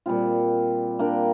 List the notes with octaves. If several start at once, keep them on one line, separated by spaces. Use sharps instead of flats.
A#2 G3 C4 F4
A#3 D4 G4